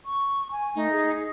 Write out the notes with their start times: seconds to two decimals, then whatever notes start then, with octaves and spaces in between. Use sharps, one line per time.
0.05 C#6
0.51 G#5
0.76 A3 D#4
0.91 G#4